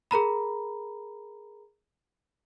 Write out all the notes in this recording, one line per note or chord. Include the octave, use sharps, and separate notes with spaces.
G#4 A#4 A#5 B5